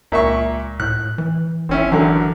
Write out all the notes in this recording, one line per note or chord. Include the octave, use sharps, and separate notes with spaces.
C#2 A#2 E5 C#6
A2 F#6
E3
G#1 C4 C#4 E4
F#2 D3 E3